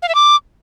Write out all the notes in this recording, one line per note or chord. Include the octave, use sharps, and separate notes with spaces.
F5
E5
D6